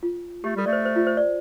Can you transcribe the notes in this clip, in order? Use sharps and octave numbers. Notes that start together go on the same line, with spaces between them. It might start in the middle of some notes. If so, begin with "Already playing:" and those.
F4
A3 G4
G3 A4
A3 D5
C5
C5
F4
C5
D5